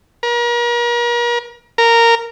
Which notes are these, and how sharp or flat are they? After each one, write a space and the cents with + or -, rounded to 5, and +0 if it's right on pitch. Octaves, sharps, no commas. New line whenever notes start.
A#4 +40
A#4 -10